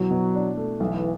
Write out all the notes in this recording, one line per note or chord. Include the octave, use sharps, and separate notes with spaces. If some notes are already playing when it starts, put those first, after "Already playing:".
Already playing: B2 E3 F#3
B2
D4
A3
B1 E3